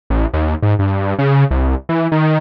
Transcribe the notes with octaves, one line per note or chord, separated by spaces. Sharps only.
A1
D#2
G#2
G2
C#3
C2
E3
D#3